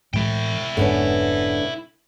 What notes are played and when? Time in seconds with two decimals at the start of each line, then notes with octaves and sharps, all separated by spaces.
0.14 A2 E3 G#3 E4 G5
0.77 F1 G#2 D3 B3 C#4 D4